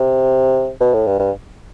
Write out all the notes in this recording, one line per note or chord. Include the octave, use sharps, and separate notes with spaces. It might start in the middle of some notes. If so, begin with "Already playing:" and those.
Already playing: C3
B2
A2
G2
G2